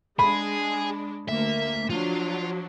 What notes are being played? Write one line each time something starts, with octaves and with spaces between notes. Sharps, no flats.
G#3 D4 G#4 B5
D2 A#3 E5
F3 F#3 D4 F4